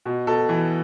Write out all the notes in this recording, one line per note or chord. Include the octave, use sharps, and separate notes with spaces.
B2
B2 A4
E3